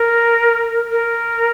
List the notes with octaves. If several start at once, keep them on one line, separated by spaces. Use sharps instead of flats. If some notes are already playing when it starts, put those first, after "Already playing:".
Already playing: A#4
A#4